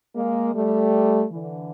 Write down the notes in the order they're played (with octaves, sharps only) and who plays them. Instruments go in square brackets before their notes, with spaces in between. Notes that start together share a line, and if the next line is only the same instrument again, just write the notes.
[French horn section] G#3 A#3
G3 A3
D3 E3